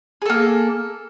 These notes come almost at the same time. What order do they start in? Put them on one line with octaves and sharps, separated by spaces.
G#4 A4 A#3